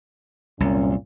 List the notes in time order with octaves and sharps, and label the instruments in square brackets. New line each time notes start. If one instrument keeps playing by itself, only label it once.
[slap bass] C2 [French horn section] F#2 A#2 C#4